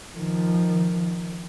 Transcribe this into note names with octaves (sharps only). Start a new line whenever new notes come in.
D#3 F3